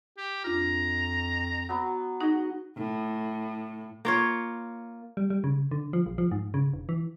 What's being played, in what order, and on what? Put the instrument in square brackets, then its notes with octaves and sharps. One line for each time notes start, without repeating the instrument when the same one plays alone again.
[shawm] G4
[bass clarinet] F2 [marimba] D4 F4 [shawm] A#5
[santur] F#3 B3
[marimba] D#4 G#4 [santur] F#4 D#5
[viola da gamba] A2
[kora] A#3 F4 C#5
[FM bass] G3
G3
C#3
D3
F3
A#1
F3
G#2
C#3
E1
E3